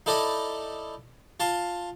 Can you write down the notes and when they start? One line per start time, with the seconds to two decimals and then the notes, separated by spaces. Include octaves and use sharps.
0.06 D#4 E4 A4 D5 D#5 B5
1.40 F4 A5 C6